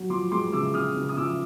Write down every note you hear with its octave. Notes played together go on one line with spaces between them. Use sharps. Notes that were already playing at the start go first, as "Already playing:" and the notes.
Already playing: F#3
F3 C6 D6
G#3 C6 D6
C#3 D6 E6
C#3 D#6 F6
C#3
D#6
F3 D6 E6